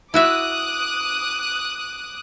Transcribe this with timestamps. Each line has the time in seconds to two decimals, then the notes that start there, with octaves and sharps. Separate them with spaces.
0.14 E4 F#4 E5 D6 D#6 F#6